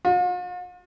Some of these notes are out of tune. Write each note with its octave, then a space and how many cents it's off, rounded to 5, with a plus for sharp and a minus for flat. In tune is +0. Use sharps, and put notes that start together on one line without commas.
F4 +45